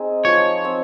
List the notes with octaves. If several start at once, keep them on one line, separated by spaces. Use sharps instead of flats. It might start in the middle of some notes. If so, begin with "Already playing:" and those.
Already playing: C4 D#4 G#4
F3 C#5
C4